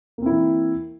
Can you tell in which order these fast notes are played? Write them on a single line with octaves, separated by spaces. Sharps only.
A#3 C4 E4 E3